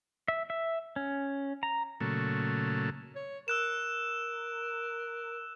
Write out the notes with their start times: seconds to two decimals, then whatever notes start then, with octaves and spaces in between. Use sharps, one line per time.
0.28 E5
0.50 E5
0.96 C#4
1.63 A#5
2.00 A#2 C#3 F#3 A3
3.16 C#5
3.48 A#4 E6 F#6 E7